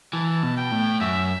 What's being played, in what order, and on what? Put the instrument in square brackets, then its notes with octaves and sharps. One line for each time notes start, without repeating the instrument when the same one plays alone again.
[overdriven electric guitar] E3 [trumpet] A5
[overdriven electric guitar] B2
[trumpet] G5
[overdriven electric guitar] A2
[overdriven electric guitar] F#2 [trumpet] E5